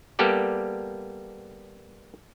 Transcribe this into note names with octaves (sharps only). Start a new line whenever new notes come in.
G3 A#3 B3 G4 A4 D5